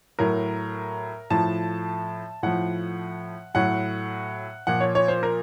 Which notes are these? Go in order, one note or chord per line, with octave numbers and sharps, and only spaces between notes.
A2 F#3 A#4
A2 F3 A5
A2 F3 F#5
A2 F#3 F#5
A#2 F3 F#5
C#5
C#5
C5
A#4